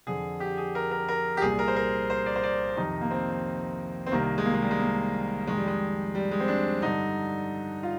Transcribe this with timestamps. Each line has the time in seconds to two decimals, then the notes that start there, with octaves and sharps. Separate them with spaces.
0.07 F2 D3 G#4
0.40 G4
0.57 G#4
0.75 A#4
0.91 A#4
1.08 A#4
1.37 G4
1.41 C2 A#2 G#4
1.59 A#4
1.68 C5
1.76 A#4
2.10 C5
2.26 D5
2.36 C5
2.43 D5
2.77 F2 C3 D#3 D#4
3.01 A#3
3.11 C4
4.06 C4
4.12 C2 C3 D#3 A#3
4.38 G#3
4.45 A#3
4.54 G#3
4.62 G3
4.71 G#3
4.79 A#3
5.47 F2 D#3 G#3
5.57 G3
5.68 G#3
6.15 G3
6.31 G#3
6.40 C4
6.48 D4
6.82 G2 D3 D#4
7.83 F4